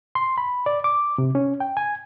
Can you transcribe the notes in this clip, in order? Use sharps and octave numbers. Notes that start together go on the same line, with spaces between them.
C6
B5
D5
D6
C3
C#4
G5
G#5